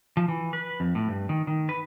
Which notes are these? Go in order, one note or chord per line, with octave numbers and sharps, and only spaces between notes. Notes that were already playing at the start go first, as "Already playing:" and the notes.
F3
E3
B4
F2
A2
G2
D#3
D#3
B4